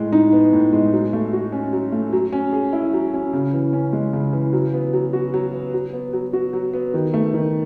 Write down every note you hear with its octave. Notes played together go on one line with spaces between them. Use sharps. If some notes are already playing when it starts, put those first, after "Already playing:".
Already playing: A2 G#3
D#4
B3
A2
G#3
F#3
A3
F#4
C#4
F#3
A3
F#3
C#4
G#4
E4
F#3
C#4
C#3
E3
C#4
G#3
C#3
E3
F#3
B3
F#3
F#4
F#3
B3
F#3
B3
F#3
F#4
F#3
B3
D#3
A3
D#3